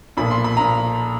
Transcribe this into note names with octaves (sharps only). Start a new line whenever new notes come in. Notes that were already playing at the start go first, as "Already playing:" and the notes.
B1 A#2 F3 B5
C6
B5
A#2 F3 A#5